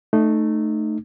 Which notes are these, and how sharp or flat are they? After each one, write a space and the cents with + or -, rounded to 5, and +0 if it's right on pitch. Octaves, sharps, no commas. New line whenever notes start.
A3 +0 D#4 -20